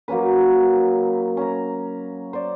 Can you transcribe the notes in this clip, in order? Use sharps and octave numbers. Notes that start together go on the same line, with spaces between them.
F#3 A#3 C#4 B4
C#4 A#5
C5 D5